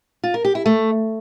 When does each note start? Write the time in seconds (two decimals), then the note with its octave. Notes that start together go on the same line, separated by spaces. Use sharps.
0.24 F4
0.34 A#4
0.45 G4
0.55 E4
0.66 A3